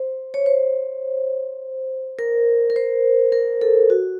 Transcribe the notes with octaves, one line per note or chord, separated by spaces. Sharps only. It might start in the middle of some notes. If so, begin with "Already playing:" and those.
Already playing: C5
C#5
C5
A#4
A#4
C5
A#4
A4
F#4